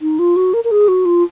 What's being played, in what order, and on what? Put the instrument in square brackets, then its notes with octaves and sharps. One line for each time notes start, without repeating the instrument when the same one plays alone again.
[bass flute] D#4
F4
F#4
A#4
A#4
G#4
F#4
F4